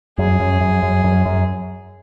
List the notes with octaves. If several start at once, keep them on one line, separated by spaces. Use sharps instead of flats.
F#2 G#4
F#2
F#2
F#2
F#2
F#2